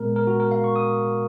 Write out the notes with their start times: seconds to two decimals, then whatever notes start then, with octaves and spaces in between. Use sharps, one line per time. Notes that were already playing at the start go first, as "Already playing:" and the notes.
Already playing: A#2 G#3 B3 A#4
0.16 A#4
0.27 F#4
0.40 A#4
0.51 F5
0.64 C#6
0.76 D#6